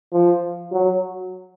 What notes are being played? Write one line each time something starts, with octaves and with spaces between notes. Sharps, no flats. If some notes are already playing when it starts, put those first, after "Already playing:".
F3
F#3